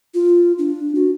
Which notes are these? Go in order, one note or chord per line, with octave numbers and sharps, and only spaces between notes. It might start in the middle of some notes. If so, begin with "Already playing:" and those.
F4
D4
F#4